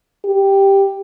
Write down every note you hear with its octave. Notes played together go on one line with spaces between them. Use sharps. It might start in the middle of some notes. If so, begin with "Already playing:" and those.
G4